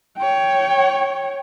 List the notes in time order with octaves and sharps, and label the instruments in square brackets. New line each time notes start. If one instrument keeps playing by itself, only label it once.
[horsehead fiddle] C#5 G5